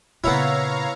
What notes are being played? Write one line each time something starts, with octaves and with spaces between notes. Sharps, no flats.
A#2 C#3 B3 E4 C#5 F5 A#5